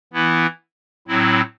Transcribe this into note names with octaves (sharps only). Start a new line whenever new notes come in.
E3 B3 E4
A2 F#3 C4 E4